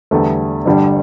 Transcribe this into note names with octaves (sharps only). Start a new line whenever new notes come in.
E2 D3 G3 A3
G1 G2 D3 G3